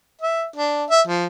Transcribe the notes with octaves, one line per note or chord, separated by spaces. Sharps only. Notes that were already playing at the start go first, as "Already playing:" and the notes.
E5
D4
E5
F3